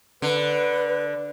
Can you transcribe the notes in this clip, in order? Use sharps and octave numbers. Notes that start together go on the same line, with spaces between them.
D3 B4